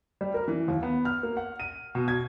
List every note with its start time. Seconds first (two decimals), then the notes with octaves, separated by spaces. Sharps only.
0.21 G3
0.34 A#4
0.48 E3
0.68 D#2
0.83 B3
1.05 F6
1.23 A#3
1.37 F#5
1.60 D#7
1.95 B2
2.08 G#6